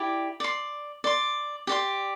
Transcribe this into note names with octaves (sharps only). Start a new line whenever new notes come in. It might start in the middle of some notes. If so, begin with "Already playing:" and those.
Already playing: E4 G4 D5
D5 C6
D5 C6
G4 D5 C6